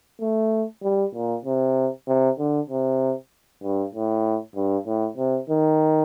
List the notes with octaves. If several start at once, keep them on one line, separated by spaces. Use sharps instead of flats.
A3
G3
A#2
C3
C3
D3
C3
G2
A2
G2
A2
C3
D#3